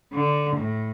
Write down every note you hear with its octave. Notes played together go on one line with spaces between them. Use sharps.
D3
A2